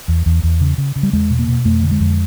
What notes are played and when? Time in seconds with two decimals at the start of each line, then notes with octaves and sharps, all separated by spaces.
0.08 E2
0.26 E2
0.43 E2
0.61 C#3
0.78 C#3
0.96 C#3
1.03 G3
1.13 E2 G#3
1.30 B2
1.39 A#3
1.48 B2
1.65 F2 A3
1.83 D3
1.91 G#3
2.00 F2